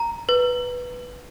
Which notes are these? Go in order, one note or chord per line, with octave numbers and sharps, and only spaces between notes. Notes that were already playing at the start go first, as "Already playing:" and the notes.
Already playing: A#5
B4